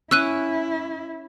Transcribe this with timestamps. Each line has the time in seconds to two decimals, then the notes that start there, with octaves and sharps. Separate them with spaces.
0.11 C#4 E4 E6 F#6 D#7